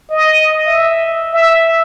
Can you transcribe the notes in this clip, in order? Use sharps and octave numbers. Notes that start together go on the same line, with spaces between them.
D#5
E5
E5